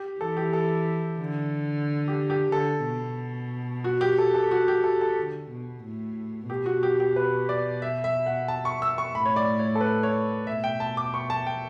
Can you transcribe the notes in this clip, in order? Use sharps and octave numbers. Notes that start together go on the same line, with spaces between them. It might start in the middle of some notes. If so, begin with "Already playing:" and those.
Already playing: G4
E3 A4
G4
A4
D3
G4
G4
D3 A4
B2
F#4
G4
A4
A4
F#4
G4
A4
A4
D3
B2
A2
B2 G4
F#4
G4
G4
B4
D5
E5
E5
F#5
A5
C#6
E6
C#6
A2 B5
C#5
D5
C#5
A4
B4
C#5
B2 E5
G5
A5
D6
C#6
A5
G5